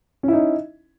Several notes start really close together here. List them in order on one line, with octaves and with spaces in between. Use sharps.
C#4 E4 D#4